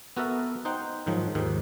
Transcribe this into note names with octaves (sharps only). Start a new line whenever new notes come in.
B3 F#4 A4 A#4 E5
D#4 C5 F#5 G5
G#2 D#3 F3 F#3
D#2 G#2 D#3